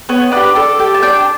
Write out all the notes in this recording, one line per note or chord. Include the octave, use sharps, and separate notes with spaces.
B3 C#5
D4 G4 B4
D4 A4
G4 A4
A5
D4 G5
A5